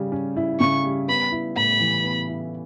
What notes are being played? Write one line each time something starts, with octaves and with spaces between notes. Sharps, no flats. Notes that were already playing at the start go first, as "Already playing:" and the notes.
Already playing: C#3 G3 C#4
C#4
E4
C#3 C#6
G3
B3 B5
E4
A2 B5
E3
B3
E4